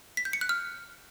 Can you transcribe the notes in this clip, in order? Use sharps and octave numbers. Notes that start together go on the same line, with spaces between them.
B6
G6
C#7
F#6
F6